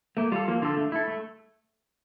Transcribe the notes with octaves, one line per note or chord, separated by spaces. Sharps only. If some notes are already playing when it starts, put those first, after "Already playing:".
A3 A#3
G3 F4 A4
F3 A#3
D3 F4 A4
A3
E4 A4
A3